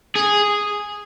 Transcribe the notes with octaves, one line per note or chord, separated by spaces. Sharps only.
G#4